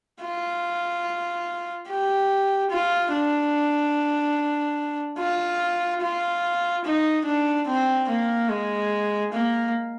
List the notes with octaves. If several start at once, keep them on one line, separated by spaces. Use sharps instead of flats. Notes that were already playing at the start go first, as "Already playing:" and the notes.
F4
G4
F4
D4
F4
F4
D#4
D4
C4
A#3
G#3
A#3